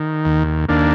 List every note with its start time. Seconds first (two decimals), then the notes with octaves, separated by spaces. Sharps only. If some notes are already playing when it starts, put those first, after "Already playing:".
Already playing: D#3
0.25 D#2
0.69 D#2 A#3 D4